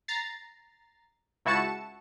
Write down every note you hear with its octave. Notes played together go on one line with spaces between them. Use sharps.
A#5 A6 C7
C#2 E4 F#4 A5 C#7 E7